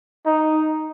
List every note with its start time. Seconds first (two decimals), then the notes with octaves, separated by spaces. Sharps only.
0.26 D#4